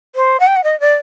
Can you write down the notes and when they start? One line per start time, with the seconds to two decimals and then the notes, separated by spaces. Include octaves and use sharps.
0.15 C5
0.40 F#5
0.47 G5
0.56 F#5
0.64 D#5
0.80 D5